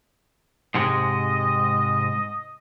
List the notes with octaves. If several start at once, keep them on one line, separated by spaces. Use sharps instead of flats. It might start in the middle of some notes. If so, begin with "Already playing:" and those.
G#2 C3 G#3 D#5